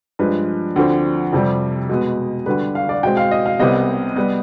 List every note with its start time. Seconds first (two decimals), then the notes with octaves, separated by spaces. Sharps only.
0.19 G2 F3 G#3 B4
0.76 D2 D3 F3 C4
1.33 F2 C3 G3 C4
1.89 B2 G#3 B3
2.46 D2 D3 G3 B4
2.75 F5
2.89 D5
3.03 B2 G#3 C4 G5
3.17 F5
3.31 D#5
3.46 F5
3.59 C2 C3 G3 B3 D#5
4.16 G3 B3